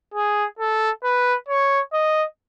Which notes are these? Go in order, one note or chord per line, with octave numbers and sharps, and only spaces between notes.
G#4
A4
B4
C#5
D#5